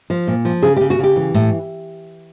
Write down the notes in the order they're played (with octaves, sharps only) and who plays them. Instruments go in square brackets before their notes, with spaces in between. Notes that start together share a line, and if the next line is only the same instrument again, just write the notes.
[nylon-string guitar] F3
A#2
F3
C#3 G#4
C#3 G4
F#4
C#3 G4
E3
A2